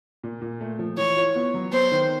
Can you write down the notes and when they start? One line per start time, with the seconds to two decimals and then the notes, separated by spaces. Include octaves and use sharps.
0.24 A#2
0.42 A#2
0.61 A3
0.79 F3
0.97 E3 C#5
1.17 F4
1.35 B3
1.54 F#3
1.72 B3 C5
1.91 D#3